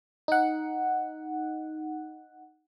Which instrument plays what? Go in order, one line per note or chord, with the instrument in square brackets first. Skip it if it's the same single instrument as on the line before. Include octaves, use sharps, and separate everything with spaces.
[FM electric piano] D#4 F#5